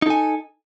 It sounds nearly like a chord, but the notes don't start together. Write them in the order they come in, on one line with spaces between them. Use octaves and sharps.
D#4 A4 G#5